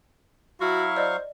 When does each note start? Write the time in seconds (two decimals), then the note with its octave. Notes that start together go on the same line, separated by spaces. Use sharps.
0.61 F#3 E4 F#4 F5 C#6
0.96 C5 D5 D#5